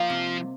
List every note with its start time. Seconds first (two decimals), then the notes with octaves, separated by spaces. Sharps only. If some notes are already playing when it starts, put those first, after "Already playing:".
Already playing: F3 A#3 D#4
0.10 C3